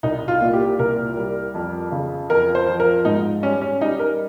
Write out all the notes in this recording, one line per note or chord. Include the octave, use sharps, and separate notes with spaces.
C2 D#4
F4
A#2
G4
C2 A#4
G3
F2
C#3
F2 A#4
C5
F3
A#4
G#2 D#4
G3 C#4
C#4
G3 D#4
A#4